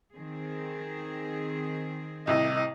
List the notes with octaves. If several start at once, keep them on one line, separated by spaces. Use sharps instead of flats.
D#3 C4 G#4
C2 A2 C3 D#5